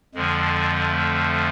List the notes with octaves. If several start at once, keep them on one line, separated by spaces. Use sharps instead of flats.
F2 D3 F3 G#3
A3